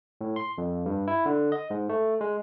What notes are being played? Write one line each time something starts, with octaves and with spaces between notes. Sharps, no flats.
A2
C6
F2
G2
E4
D3
D#5
G#2
A3
G#3